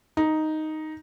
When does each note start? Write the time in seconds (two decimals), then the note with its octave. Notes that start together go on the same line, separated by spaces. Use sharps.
0.17 D#4